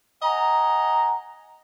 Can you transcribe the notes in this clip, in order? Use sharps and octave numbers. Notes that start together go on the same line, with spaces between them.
D#5 F#5 G#5 A#5